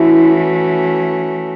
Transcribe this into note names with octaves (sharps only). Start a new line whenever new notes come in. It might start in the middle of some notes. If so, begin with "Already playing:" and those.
Already playing: E3 A3 C#4 E4 F#4